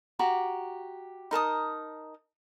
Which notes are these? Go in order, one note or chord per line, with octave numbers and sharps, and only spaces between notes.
F#4 G4 A#5 D6
D#4 A#4 A5 D#6